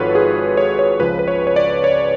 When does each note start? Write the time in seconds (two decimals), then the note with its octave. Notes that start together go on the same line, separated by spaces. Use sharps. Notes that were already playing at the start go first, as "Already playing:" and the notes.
Already playing: G#1 G#2 F3 F4 F#4 A4 B4 C#5
0.15 G#4
0.57 C#5
0.79 C#5
1.00 C#2 C#3 F3 B4
1.19 B4
1.28 C#5
1.47 C#5
1.56 D5
1.84 C#5